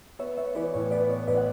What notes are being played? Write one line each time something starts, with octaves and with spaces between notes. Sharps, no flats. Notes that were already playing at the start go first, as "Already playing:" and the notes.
B3 C#5 E5
B3 C#5 E5
E3 B4 D5
A2 C#5
B3 B4 D5
B3 C#5
A1 B4 D5
F#5